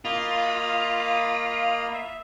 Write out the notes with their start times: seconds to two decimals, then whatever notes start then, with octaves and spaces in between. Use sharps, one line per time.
0.05 A#3 F4 D#5 B5
1.93 E5